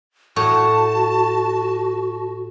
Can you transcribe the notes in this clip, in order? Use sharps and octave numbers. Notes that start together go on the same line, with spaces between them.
A2 F#4 F#5 A5 C#6